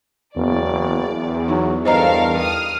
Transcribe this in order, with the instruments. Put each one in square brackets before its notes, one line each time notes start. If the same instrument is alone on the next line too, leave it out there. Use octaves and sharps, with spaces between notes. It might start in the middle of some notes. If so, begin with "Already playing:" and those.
[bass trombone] F#1 [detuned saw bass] E2 [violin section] D5
[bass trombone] F#3 [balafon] D#4
[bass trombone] G2 [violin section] A4 A#4 F5 [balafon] C5 D#5 A#5
[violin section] D#6 F6